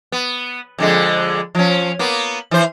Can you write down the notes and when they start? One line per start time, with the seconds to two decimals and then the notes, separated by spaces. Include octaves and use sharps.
0.12 B3
0.78 F2 D3 G#3
1.55 F3 C#4
1.99 A#3 B3
2.51 E3 C5